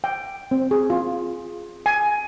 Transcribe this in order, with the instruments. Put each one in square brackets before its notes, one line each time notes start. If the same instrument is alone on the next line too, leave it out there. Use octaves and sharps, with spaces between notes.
[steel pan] G5
C4
G#4
F4
G#5